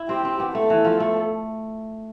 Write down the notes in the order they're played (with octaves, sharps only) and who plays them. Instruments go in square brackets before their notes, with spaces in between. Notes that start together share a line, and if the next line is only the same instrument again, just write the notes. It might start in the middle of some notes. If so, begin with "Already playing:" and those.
Already playing: [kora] E4
[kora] C4 [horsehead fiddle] G4
[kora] C4
B3
[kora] A3 [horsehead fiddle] A4
[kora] E3
F3
A3